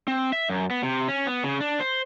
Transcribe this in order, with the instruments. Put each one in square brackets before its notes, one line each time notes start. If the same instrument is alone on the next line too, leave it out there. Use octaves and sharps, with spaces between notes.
[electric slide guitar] C4
E5
F#2
B3
C3
C#4
B3
C#3
D4
C5